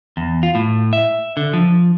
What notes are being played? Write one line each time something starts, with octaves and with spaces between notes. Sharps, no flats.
E2
F4
A2
E5
D3
F3